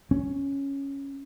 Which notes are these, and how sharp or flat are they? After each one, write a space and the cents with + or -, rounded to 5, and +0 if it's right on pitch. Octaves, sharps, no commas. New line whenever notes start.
C#4 +0